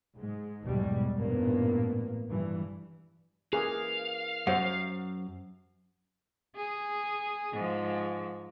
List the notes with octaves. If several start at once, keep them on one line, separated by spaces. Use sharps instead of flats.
G#2 G#3
B1 E2 G#2 B2 G3 G#3
A1 G2 A#2 A#3 B3
G2 E3
E3 A#3 G#4 F5
F#2 C5 F#5
G#4
G#2 F3